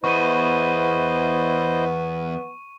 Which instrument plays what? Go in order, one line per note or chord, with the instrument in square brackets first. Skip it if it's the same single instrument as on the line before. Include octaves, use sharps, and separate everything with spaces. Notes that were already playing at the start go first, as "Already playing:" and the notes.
[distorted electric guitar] E2 [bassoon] B3 [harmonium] E4 C5 D#5 [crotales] C#6 D#7